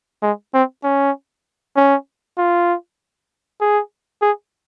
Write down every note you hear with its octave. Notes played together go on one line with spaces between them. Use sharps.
G#3
C4
C#4
C#4
F4
G#4
G#4